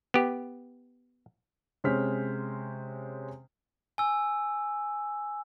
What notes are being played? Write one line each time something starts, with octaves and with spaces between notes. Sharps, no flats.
B3 G4
C3 G#3 C#4 C5 F6 B6
G#5 E6